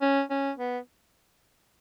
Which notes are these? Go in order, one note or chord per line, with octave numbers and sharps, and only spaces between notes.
C#4
C#4
B3